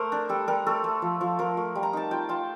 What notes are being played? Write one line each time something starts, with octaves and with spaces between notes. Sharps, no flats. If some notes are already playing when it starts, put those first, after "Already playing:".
Already playing: A3 A#4 C5
D4
G3 A4
G3 A#4
A3 A4
A3
F3
F3
F3 A#4
A3
G3
A#5
D#4 A5
F4 G5
F4 A5